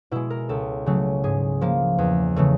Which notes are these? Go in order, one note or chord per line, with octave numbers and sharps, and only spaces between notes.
B2 G#3 E4
A#4
C#2 A4
C#3 F#3 A3
G#2 G#4
F3 A#3
E2
C#3 E3 A3